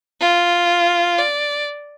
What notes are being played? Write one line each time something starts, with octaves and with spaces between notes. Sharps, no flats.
F4
D5